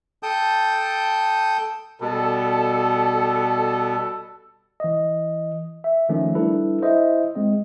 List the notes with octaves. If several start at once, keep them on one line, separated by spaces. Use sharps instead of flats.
A4 G5 A5 D#6 G6
B2 G3 A4
E3 D#5
E5
D#3 F3 A3 C#4 D#4
G3 D4 E4 A4 B4
E4 C5 D#5 E5
G#3 C4 D#5